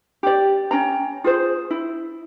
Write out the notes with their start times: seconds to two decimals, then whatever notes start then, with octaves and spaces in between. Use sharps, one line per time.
0.23 G4 D5
0.71 C#4 G5 A#5
1.24 F4 G#4 C5
1.71 E4